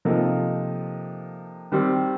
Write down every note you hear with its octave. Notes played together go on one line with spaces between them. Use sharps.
C3 F3 A#3 D#4 A4
D#3 G3 C4